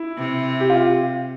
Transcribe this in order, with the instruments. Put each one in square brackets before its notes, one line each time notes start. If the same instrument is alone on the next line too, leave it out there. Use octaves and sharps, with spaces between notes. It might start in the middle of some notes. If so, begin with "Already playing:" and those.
Already playing: [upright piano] E4
[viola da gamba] C3
[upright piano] G4
F4